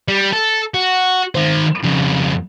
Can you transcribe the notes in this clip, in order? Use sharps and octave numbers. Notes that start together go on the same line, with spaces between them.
G3
A4
F#4
D#3 C5
F2 C#3